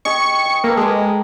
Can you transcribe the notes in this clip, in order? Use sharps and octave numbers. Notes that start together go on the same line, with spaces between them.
G4 G#4 D#5 C#6
G5
A#3 G4 A4 B4
G#3 A#4 D6